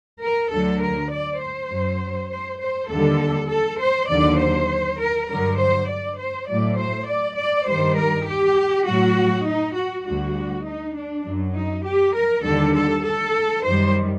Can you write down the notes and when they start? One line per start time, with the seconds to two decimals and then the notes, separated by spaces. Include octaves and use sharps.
0.21 A#4
0.51 D2 D3 F#3 A4
0.81 A#4
1.11 D5
1.41 C5
1.70 F#2 F#3
2.30 C5
2.59 C5
2.89 D#2 D3 G3 A4
3.49 A4
3.79 C5
4.09 D#2 D3 F#3 D5
4.39 C5
4.99 A#4
5.28 G2 D3 F#3 A#4
5.57 C5
5.88 D5
6.18 C5
6.48 A2 F#3 D5
6.78 C5
7.07 D5
7.37 D5
7.67 G2 D#3 G3 C5
7.97 A#4
8.27 G4
8.86 A2 F#3 F#4
9.46 D#4
9.75 F#4
10.06 D2 D3 G3 F#4
10.65 D#4
10.95 D4
11.25 F#2 F#3
11.55 D#4
11.85 G4
12.14 A#4
12.44 D#2 D3 G3 A4
12.74 A4
13.04 A4
13.63 F#2 D#3 G3 C5